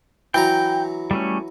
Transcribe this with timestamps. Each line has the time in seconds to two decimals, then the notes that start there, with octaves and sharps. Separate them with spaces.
0.34 E3 F#3 G5 A#5
1.11 G3 A3 C#4